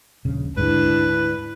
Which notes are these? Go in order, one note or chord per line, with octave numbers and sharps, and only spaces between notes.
D#1 A#1 C#3
D2 G#2 D4 E4 B4